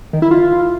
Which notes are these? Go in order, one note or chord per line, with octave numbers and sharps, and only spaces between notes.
D#3
E4
F4